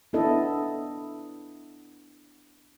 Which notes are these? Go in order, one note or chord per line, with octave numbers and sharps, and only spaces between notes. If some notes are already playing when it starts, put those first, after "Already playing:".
B3 D4 E4 A4 D#5